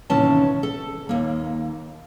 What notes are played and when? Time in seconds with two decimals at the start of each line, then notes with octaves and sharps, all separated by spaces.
0.10 D#2 A2 C3 E3 C#4 A5
0.63 A4
1.09 D#2 A#3